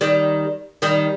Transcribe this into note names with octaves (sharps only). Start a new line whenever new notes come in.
D#3 G3
D#3 G3